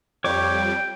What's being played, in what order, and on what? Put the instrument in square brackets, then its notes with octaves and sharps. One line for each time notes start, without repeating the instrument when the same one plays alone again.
[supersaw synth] F2 G3 [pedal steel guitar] C#5 D6 [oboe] G5